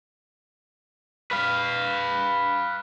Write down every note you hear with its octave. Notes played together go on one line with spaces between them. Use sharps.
B4 F5